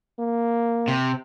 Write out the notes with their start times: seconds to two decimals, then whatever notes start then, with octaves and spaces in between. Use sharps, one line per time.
0.20 A#3
0.88 C3